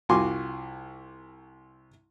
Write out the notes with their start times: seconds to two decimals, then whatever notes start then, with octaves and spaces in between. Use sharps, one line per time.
0.09 C2 F4 F#4 G#5 C6 D6